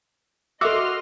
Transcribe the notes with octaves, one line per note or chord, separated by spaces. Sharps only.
F#4 A4 D#5 E5 C6 D6 E6 F6